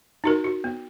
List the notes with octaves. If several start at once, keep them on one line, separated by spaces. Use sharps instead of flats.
D#4 F#4 A#4
F#4
B3